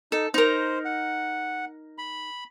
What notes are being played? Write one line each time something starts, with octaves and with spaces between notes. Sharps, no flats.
D#4 A4
D#4 A#4 C5
F#5
B5